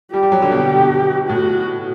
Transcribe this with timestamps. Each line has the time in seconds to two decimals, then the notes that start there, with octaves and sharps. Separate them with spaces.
0.12 G3 G4
0.23 G3
0.32 F#3
0.42 D3
0.52 B2
1.29 A2 F#4